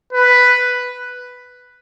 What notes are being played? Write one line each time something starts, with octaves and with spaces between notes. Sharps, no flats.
B4